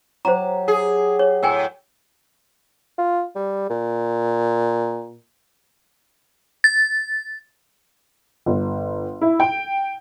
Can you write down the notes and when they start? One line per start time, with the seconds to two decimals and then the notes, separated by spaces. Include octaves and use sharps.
0.25 F#3 G4 C5 A#5
0.68 G#4
1.19 C#5
1.43 A2 A#4 G5 G#5
2.98 F4
3.35 G3
3.70 A#2
6.64 A6
8.46 G1
9.21 E4
9.40 G5